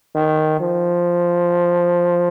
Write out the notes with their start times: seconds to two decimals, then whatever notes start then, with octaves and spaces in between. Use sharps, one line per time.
0.15 D#3
0.60 F3